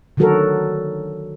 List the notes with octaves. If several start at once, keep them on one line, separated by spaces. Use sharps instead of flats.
D3 D#3 F#3 F#4 A4 A#4